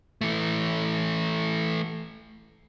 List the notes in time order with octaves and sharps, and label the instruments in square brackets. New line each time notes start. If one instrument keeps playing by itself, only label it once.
[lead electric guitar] E3 A3